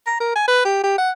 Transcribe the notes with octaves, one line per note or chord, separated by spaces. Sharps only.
A#5
A#4
G#5
B4
G4
G4
F#5